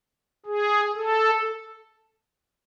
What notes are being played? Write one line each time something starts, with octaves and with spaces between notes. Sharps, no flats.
G#4
A4